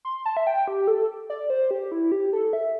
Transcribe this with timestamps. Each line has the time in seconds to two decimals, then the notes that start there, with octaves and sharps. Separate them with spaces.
0.05 C6
0.26 A5
0.37 E5
0.47 G5
0.68 G4
0.88 A4
1.30 D5
1.50 C5
1.71 G4
1.92 E4
2.12 G4
2.33 A4
2.53 E5